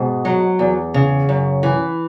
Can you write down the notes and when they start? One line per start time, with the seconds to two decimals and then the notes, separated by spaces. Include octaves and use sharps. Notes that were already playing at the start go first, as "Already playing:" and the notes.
Already playing: G#2 B2
0.25 F#3
0.59 E2
0.94 C#3
1.29 F#2
1.63 E3